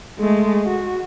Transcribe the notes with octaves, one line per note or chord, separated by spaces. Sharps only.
G#3 A3
F#4